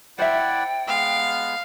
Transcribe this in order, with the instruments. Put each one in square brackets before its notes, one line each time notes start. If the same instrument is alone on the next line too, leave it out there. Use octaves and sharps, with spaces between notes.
[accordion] E4 D5 F#5 [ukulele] C5 E5 [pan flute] G5
[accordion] G#3 B3 [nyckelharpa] F5